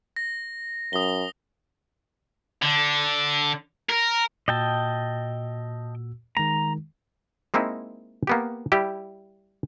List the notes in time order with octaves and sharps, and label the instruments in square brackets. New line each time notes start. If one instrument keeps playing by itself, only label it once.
[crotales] A#6
[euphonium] F#2 [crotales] D#6 G7
[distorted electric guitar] D3
A#4
[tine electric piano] A#2 F#4 E6 [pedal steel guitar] D#5 G5 A5
[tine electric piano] D#3 G#3 [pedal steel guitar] A#5
[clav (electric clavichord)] G#3 A#3 C4 D#4 E4
A#3 B3 G4
G3 E4 G4